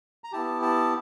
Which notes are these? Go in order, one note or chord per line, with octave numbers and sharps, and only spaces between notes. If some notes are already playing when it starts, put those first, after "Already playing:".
A#5
B3 E4 G4 A5
A5